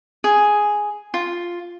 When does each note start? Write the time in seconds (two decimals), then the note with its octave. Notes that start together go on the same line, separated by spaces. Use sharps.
0.24 G#4
1.14 F4